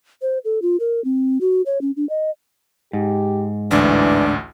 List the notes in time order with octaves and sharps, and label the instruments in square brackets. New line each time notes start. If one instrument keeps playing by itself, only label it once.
[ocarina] C5
A4
F4
A#4
C4
F#4
C#5
C#4
D4
D#5
[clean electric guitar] G#2 [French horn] G4
[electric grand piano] A1 D2 [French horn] E3 [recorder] D4